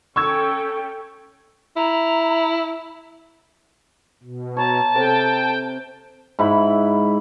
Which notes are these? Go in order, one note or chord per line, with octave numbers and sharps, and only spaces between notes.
C#4 A4 G5 C#6 E6 G#6
E4 A#5
B2
C#5 A5 A#5
C3 A4 G5
G#2 E4 B5